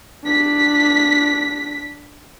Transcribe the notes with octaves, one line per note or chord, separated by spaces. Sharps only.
D4 B6